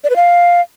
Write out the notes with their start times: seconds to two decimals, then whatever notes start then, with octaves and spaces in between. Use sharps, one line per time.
0.04 D5
0.10 B4
0.16 F5